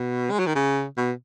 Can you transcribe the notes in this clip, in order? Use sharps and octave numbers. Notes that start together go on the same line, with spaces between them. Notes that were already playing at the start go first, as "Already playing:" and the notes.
Already playing: B2
G#3
F#3
D#3
C#3
B2